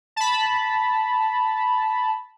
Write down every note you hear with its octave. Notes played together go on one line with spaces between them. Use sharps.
A5 B5